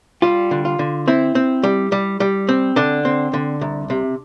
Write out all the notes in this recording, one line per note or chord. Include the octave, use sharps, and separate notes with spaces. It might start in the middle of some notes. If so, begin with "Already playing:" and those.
G3 F4
D3
F4
D3
C4 E4
C4
G3
G3
G3
C4
D3 D4
C4
D3
C2
C3